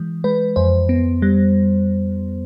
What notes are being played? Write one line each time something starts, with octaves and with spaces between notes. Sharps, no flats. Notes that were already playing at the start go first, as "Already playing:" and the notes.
Already playing: E3 G#3
G#3 B4
F2 C5
B3
G3